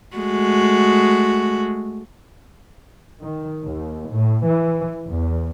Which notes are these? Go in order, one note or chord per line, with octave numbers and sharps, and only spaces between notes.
G#3 A3 F#4
D#3
D#2
A2
E3
E2